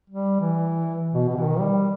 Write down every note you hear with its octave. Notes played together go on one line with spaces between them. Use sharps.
G3
E3
B2
B2
E3
D#3
G3